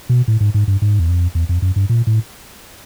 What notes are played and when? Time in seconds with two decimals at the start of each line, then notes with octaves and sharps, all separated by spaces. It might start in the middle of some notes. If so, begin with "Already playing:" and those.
0.09 B2
0.28 A2
0.40 G#2
0.54 G#2
0.68 G2
0.82 G#2
0.99 E2
1.09 F2
1.35 E2
1.49 F2
1.62 F#2
1.76 G2
1.89 A#2
2.07 A2